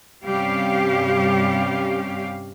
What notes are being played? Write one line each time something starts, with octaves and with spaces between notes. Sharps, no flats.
G2 C3 G3 C#4 G4 F5